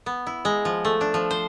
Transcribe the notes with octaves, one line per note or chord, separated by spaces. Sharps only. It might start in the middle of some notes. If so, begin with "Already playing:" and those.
B3
E4
G#3
F3
A3
D4
F3
C5